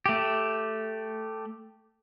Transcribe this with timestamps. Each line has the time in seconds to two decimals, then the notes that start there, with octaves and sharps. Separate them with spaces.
0.06 A3 G4